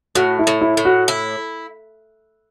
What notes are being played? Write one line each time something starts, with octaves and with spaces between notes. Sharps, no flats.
A2 F#4
E4
A2
E4
A2
F#4
E4